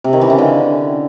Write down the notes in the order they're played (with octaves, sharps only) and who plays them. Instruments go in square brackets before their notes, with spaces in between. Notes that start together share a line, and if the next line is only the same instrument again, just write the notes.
[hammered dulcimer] C3
D#3
E3
C#3
D3